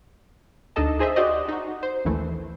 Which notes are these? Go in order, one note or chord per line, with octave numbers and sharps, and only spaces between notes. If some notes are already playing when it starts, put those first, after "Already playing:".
D2 D4 D#4 A4 D#5 A5
D#4 G#4 C5 D#5 E5
F#4 G4 C5 D5 D#5
D#4 F#4
C5
A#1 D#2 E3 A3